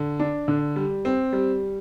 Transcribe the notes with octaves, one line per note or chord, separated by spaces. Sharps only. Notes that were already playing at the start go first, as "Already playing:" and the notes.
Already playing: D3
D4
D3
G3
C4
G3